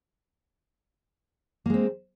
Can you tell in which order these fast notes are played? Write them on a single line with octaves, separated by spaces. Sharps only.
A#3 G#3 C4